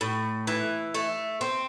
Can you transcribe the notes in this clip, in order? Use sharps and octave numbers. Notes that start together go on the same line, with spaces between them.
A2
E3
A3
C4